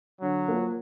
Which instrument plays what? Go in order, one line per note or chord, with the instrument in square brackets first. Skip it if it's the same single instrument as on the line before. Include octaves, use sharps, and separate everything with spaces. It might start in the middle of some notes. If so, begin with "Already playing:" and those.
[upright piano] D3 [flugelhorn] F#3
[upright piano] F3 A#3